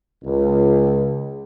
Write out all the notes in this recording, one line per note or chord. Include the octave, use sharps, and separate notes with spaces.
C#2